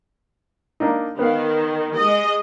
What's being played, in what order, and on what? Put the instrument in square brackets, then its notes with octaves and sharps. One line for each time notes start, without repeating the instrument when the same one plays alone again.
[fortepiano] A#3 D4 D#4
[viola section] D#3 [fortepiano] B3 F5
[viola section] G#3 D#5